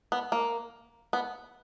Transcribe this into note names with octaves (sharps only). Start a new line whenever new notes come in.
B3
A#3
B3